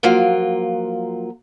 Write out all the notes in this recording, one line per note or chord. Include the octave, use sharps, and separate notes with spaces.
F3 F#3 A#3 F4